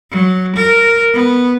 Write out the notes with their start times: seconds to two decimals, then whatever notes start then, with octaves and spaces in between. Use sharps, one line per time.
0.11 F#3
0.56 A#4
1.14 B3